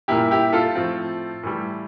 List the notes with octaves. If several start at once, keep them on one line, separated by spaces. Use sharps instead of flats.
A#2 G3 A#3 E4 G4
E4 G4
F4 A4
A2 F3 C4
A2 E3 G3